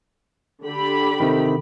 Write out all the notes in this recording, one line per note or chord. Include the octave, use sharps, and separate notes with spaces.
D3 G4 B5
C3 D#3